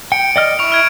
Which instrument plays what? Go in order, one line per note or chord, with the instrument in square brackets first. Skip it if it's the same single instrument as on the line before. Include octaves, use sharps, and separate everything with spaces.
[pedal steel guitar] G5 [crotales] C#7 D7
[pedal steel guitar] D5 D#5 F6
[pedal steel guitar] E4 [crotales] C#6 D7 F7
[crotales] F6 G#6 D7